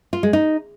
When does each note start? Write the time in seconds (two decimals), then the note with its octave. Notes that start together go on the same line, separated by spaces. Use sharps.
0.13 F4
0.23 G#3
0.33 D#4